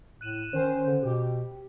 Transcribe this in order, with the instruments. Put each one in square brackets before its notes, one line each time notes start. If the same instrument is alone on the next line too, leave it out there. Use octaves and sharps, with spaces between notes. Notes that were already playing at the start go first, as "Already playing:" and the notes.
[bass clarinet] A2 [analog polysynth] F#6 D#7 E7
[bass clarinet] D#3 [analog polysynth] C#4 C5
[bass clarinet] D3
[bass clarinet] B2 [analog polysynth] G4